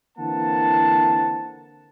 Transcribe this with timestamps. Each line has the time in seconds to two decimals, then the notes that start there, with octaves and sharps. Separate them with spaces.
0.18 D3 E3 A#3 C4 F#5 A5